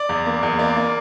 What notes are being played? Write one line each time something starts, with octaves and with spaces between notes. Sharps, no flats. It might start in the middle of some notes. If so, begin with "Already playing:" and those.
Already playing: D5
E2
A#3
E2
A#3 D5
A#3